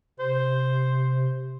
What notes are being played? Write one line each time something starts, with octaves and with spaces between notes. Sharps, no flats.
C3 C5